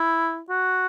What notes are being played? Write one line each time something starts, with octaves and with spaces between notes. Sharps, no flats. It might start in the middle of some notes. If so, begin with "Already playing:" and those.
Already playing: E4
F#4